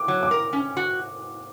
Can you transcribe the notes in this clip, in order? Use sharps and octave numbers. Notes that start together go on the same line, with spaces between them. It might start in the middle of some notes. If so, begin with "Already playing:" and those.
Already playing: D6
F#3
D6
A#4
C#4
F#4